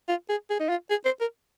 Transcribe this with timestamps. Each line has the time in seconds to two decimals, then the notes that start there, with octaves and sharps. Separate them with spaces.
0.09 F4
0.30 G#4
0.50 G#4
0.60 D#4
0.69 F4
0.90 G#4
1.05 C5
1.21 A#4